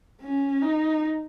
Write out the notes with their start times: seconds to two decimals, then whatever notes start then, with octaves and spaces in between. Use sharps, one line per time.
0.22 C#4
0.62 D#4